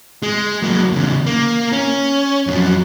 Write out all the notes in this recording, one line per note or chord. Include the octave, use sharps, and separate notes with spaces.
G#3
F#3 A#3
E2 C#3
A#3
C#4
F2 F#3